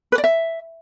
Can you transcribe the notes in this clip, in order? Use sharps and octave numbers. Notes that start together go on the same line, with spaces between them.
B4
D5
E5